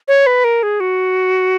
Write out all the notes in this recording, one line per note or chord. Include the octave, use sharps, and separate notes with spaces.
C#5
B4
A#4
G#4
F#4